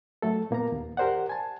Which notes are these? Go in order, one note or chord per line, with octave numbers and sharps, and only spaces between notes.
F#3 A3 A4
A#2 A#3 B3 A#5
D#2
G4 A#4 C5 D5 F#5
G#5 A5